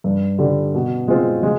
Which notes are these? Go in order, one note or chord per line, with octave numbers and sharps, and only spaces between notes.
G2
D3 G3
B2
G#3 C4 F4
G#3